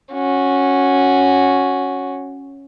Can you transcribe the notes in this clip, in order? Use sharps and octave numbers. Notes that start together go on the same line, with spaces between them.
C#4 F#4